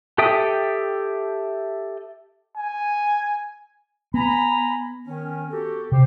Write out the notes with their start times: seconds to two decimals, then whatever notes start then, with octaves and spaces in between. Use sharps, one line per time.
0.18 G4 A4 E5 G5 D#6
2.56 G#5
4.14 B3 G#5 A#5 B5
5.06 D#3 C#4
5.51 F#4 G4 A4
5.92 C3 G4 C5 G5